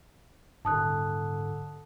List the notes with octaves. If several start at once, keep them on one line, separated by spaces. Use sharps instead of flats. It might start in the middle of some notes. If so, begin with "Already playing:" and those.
D#1 G#2 D3 A5 D#6 F#6